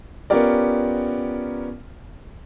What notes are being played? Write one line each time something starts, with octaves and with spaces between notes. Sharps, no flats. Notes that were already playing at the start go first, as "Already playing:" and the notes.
B3 C#4 F4 G4 A#4 D5